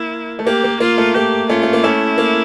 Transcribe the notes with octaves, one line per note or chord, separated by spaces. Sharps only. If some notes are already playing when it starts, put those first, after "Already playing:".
Already playing: A#3 E4
A3
A#3 G4
A#3
A#3 F4
A3
A#3 G4
A3 C#4 F4
A3
A#3
A3 C#4 E4
A#3